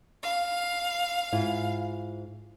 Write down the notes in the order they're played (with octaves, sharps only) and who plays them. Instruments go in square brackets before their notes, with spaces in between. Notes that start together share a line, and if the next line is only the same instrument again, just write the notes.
[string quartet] F5
[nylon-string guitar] G#2 E4 F4